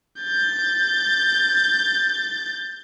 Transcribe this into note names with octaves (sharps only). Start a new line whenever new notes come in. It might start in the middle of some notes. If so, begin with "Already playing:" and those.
G6 A6